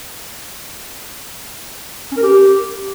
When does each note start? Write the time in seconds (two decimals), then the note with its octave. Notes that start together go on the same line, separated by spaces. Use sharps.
2.12 C#4
2.17 A#4
2.23 G4